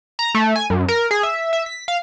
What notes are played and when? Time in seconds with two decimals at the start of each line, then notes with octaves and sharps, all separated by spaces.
0.19 A#5
0.35 A3
0.56 G#5
0.70 F#2
0.88 A#4
1.11 G#4
1.23 E5
1.53 E5
1.66 B6
1.88 F5